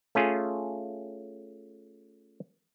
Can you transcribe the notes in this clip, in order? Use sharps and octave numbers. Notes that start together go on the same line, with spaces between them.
A3 C#4 F4 G#4